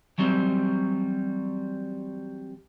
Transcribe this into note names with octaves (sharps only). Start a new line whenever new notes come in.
E3 F#3 G3 C4